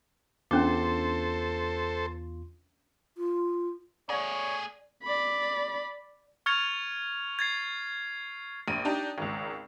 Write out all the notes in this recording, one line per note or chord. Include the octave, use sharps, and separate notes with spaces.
E2 C#4 D4 F4 A4 C5 C6 D6
F4
A3 G#4 C#5 D5
D5 B5
C#6 F6 G#6 A6 C#7 F7
G#6 A6 C7
A#1 D#7
D4 D#4 G4 D5
G#1 C#2